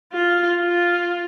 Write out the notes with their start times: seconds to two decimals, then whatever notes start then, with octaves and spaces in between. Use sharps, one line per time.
0.13 F4
0.60 F4